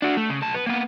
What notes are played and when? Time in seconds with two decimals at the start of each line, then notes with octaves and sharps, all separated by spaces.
0.02 D4 F#4
0.17 A3
0.30 C#3
0.42 B1 A5
0.55 B3
0.67 A#3 B3